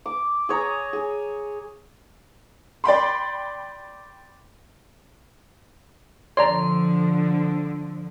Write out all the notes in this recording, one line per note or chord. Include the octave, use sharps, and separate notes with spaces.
D6
G#4 C#5 A#5
G#4
D5 G5 B5 C6
D3 F3 C#5 D5 A#5 C6